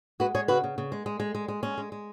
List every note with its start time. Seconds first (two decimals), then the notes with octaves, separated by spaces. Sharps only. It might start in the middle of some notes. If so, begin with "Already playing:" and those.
0.20 G#3 F#4 B4
0.34 G#3 G#4 C#5
0.48 C#3 F#4 B4
0.64 C#3
0.78 C#3
0.92 G#3
1.06 G#3
1.20 G#3
1.35 G#3
1.48 G#3
1.63 G#3 C#4
1.78 G#3
1.92 G#3